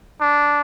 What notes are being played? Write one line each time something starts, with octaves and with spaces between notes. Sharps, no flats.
D4